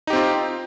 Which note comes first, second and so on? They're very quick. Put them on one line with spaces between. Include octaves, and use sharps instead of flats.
D#4 G4 C4 F4